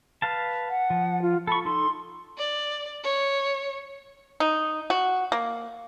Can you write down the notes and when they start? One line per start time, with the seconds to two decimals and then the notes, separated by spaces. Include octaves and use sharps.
0.22 B4 F5 A5
0.70 F#5
0.90 F3
1.22 F4
1.47 A4 B5 C#6
1.65 D#4 A4 C6
2.38 D5
3.04 C#5
4.40 D#4
4.90 F#4
5.32 A#3